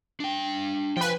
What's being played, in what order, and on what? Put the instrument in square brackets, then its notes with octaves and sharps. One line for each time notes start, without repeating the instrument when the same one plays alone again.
[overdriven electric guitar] D4 G5
[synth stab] F3 B4 [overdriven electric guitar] G5 G#5